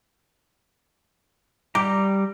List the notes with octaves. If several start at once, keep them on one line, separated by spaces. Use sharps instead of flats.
G3 G4 A#5